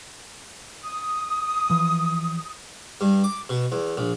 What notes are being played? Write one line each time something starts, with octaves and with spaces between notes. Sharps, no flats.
D#6
E3 F3
G2
D6
B2
E2
A#1